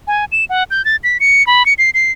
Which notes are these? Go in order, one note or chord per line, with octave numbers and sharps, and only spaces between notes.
G#5
E7
F#5
G6
A6
B6
C#7
B5
C#7
C7
C7